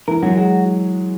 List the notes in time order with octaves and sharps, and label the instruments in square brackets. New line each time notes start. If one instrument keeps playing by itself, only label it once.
[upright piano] E3 [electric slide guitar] A#4
[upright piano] F#3 [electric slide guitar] F#4
[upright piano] G#3 [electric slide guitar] F#4